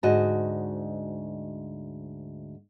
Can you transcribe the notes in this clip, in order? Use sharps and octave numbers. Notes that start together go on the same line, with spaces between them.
D2 G#2 F#4 D#5